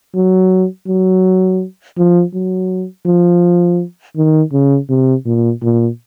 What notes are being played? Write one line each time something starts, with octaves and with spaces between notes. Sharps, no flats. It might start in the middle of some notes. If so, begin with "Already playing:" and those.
F#3
F#3
F3
F#3
F3
D#3
C#3
C3
A#2
A#2